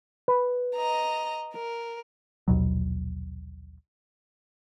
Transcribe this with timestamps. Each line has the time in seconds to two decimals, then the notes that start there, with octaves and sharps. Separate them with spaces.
0.28 B4
0.76 D#5 A#5
1.54 A#4
2.48 A#1 D#2 B2 F#3